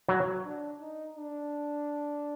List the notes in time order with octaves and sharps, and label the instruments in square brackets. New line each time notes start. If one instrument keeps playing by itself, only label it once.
[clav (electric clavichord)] F#3
[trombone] D4
D#4
D4